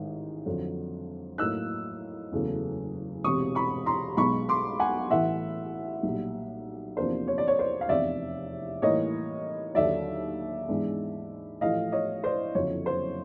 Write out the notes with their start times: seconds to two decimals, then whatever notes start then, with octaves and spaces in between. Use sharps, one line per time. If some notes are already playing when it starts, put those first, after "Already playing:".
Already playing: A1 G#2 D#3
0.46 F2 D3 F#3
1.38 A2 F#3 A#3 D#4 E6 F#6
2.32 F#1 E2 C#3 F#3 A3
3.24 E1 E2 C3 C#6 D#6
3.55 B5 C#6
3.86 A#5 C6
4.17 B1 B2 G#3 B3 B5 C#6
4.49 C6 D6
4.79 F#5 G#5
5.10 A1 A2 E3 A3 E5 F#5
6.03 B1 A#2 G3
6.96 E2 C3 F3 A#3 D4 C5
7.27 C#5
7.38 D5
7.47 C#5
7.59 C5 D5
7.81 F5
7.89 F1 E2 C3 D5 E5
8.82 A2 E3 G3 A#3 D#4 C#5 D#5
9.75 D#2 D3 F#3 D5 E5
10.68 G#2 E3 G#3 B3 D4
11.61 A1 A2 F3 A3 D#5 F5
11.92 C#5 D#5
12.24 C5 D5
12.55 F#1 F2 D3 F#3 C#5
12.86 C5